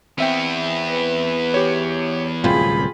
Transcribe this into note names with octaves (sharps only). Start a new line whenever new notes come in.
E2 B3 C4 E5 G5
B4
G4 C#5
D1 C2 F#2 F4 G#4 G5 B5